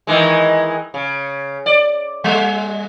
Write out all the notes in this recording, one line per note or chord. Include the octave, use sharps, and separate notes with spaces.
D#3 E3 G#3
C#3
D5
G3